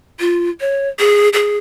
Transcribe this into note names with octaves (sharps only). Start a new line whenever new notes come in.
F4
C#5
G#4
G#4